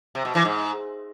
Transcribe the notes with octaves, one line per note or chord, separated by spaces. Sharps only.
C3
B2
E3
G#2